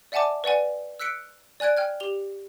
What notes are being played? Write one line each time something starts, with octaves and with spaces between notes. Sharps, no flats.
D5 E5 F#5 G#5 A5 D6
B4 D5 F#5 G#5
E6 F#6 B6 C#7 D7
D5 G#5 F#6 G#6 D7
G5 F6 G#6
G4 F7 G7